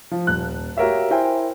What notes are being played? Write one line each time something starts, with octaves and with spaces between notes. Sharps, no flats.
F3
D#1 F#6
F#4 G4 A#4 C#5 E5 F5
E4 A#4 C5 E5 G5 G#5